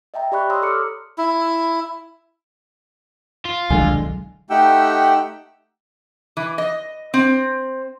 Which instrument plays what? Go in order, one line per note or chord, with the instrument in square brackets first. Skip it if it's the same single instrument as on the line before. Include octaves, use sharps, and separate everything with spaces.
[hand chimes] D#5 E5 G5 A#5
G4 D5 B5 C#6 F#6
C#5 A#5 C6 D#6 E6
A4 D6 E6 F6 C#7
[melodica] E4
[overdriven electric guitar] F4
[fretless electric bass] E1 D3 G#3 [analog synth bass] C2 [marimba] D#3 F#3 G#5
[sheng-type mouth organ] A3 D#4 G4 F#5 G5 E6
[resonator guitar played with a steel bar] E3
D#5
C4